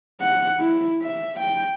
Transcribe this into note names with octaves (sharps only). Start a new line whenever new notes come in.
F#5
E4
E5
G5